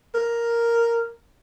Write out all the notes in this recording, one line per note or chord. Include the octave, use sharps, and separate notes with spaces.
A#4